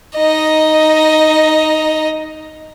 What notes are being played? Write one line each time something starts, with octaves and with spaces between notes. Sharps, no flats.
D#4 D#5